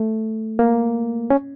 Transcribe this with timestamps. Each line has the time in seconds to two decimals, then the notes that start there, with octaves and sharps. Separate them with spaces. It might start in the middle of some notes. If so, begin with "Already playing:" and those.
Already playing: A3
0.59 A#3
1.30 C#4